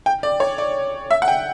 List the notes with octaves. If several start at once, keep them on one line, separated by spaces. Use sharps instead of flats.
G5
D5
C#5
D5
E5
F#5
G5